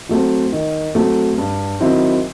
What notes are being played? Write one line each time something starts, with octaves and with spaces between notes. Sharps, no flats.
F#3 A3 C4
D#3
F#3 A3 C4
G2
D#3 F#3 C4 E4